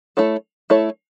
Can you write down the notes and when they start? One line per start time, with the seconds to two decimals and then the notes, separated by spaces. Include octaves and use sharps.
0.17 A3 E4 A4 C#5
0.70 A3 E4 A4 C#5